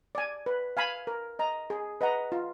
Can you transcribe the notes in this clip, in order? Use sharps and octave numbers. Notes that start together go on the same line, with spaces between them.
D5 G#5
B4
F5 G#5 B5
A#4
D#5 A#5
G#4
B4 D#5 F#5 A#5
F4